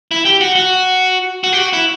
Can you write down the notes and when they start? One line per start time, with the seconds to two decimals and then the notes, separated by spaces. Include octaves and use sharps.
0.11 E4
0.25 G4
0.41 F#4
0.56 F#4
1.44 F#4
1.53 G4
1.58 F#4
1.73 E4